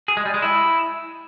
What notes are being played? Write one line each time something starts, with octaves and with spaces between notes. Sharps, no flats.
G#4
G#3
G3
G#3
E4